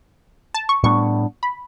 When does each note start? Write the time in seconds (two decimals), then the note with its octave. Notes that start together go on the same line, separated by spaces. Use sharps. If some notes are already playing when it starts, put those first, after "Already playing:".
0.54 A5
0.69 C#6
0.83 A2 G3 B3 D4 C#6
1.43 B5